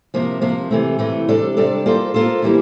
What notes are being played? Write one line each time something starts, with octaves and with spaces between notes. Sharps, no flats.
C3 F3 A#3
C3 F3 A#3
C3 E3 A3
C3 E3 A3
C3 G3 D4 A4 D5
C3 G3 D4 A4 D5
A#3 F4 A4 C5
A#3 F4 A4 C5
E3 G3 A#3 E4